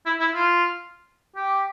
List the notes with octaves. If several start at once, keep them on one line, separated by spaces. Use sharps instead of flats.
E4
E4
F4
G4